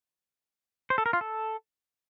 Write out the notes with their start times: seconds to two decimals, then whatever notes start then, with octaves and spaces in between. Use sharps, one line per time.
0.90 C5
0.98 A4
1.06 A#4
1.13 F4
1.21 A4